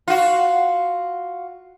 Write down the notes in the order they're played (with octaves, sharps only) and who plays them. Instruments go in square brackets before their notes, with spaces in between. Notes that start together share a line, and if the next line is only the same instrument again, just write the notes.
[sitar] F4 F#4